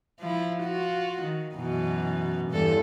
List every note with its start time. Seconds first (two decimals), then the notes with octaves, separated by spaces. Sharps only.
0.20 F3 E4
0.63 F4 F#4
1.23 D#3
1.55 F#2 B2 E3
2.51 E2 G2 A4